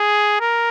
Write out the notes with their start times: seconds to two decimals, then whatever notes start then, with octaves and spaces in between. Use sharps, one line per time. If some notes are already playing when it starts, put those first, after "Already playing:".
Already playing: G#4
0.40 A#4